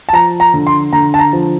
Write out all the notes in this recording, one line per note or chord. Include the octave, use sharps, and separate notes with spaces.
A5
F3 A#5
A#5
D3
C6
D3 A#5
A5
A#5
F3